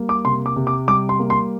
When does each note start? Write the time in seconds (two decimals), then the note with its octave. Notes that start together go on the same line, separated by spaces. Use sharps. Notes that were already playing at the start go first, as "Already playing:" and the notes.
Already playing: G3 A#3
0.09 D6
0.25 C3 C6
0.46 D6
0.56 C3
0.67 D6
0.88 G3 D6
1.09 C6
1.20 A#3
1.30 C6